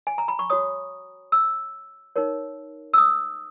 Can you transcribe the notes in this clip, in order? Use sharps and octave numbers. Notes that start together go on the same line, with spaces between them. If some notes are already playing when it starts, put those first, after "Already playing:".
G#5
A#5
B5
C#6
F#4 C#5 D#6
E6
D#4 A#4 C#5
E6
D#6